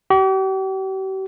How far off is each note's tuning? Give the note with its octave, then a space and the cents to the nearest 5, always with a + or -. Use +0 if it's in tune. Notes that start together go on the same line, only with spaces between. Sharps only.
G4 -45